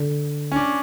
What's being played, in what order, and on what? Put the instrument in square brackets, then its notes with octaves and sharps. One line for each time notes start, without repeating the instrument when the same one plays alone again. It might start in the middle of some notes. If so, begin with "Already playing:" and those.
Already playing: [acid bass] D3
[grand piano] C#4
D4